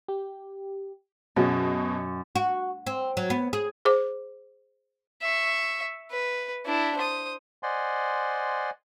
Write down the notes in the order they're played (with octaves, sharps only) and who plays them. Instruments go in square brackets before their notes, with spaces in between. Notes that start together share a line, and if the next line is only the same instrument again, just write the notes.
[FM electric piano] G4
[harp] F#2 [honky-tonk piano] B2 [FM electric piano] C#4 G#4 D#5
[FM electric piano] C#6
[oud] F#4
C4
F#3
B3
G#4
[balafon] G#4 C5 D6
[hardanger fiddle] E5 C#6
B4
D4 E4
C5 D#6
[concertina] C5 D5 D#5 F#5 G#5 C6